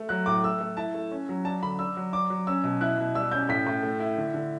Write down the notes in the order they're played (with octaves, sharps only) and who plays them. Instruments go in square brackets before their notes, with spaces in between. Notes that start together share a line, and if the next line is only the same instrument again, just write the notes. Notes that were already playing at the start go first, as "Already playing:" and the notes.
Already playing: [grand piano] A3
F#3 F#6
A2 D6
A3 E6
A3
E4 A5
A3
C#4
F#3
D4 A5
D3 B5
D4 E6
F#3
D4 D6
F#3
C#4 E6
B2
E4 F#6
B2
G3 E6
C#4 G6
A2 B6
A2
A3
E4
D3
D3